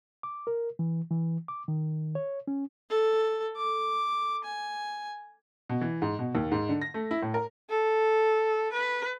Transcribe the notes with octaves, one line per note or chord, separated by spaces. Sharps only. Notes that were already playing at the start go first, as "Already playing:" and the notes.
D6
A#4
E3
E3
D6
D#3
C#5
C#4
A4
D6
G#5
B2
E3
G#2
B2
D#2
G#2
D3
A#6
A3
E4
A2
A#4
A4
B4